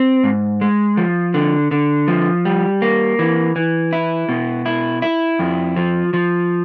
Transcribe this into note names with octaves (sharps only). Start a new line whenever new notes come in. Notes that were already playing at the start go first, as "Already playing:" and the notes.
Already playing: C4
G#2
G#3
F3
D3
D3
F3
G3
A#3
E3
E3
E4
B2
E4
E4
F2
F3
F3